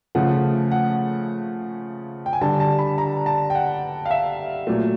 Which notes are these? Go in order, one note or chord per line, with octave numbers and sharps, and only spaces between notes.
C#3 F3 A3 F#5
F#5
G5
G#5
D3 G3 A5
A5
B5
A#5
A5
G5
F#5
F5
E5
A#2 F#3 A3